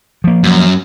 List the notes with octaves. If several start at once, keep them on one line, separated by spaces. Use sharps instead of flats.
F3 A#3
F#2